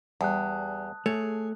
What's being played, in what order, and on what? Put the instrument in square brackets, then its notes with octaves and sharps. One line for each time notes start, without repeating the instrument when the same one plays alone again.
[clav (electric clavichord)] E2 [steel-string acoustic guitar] G3 [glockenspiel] A5 D#6 F#6
[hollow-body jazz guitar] A3 [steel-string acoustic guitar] G#4 [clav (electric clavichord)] C#5